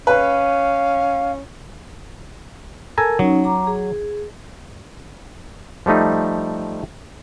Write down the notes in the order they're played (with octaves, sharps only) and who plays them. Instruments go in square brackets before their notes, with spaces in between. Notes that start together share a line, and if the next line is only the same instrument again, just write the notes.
[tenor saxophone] C#4 [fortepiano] B4 [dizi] F5
[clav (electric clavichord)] A4 G#5 A#5 [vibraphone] A#4
[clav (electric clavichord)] F#3 [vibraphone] C#4 D#4
[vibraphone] A#5 D6
G#4
[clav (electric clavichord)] F3 G3 A3 D#4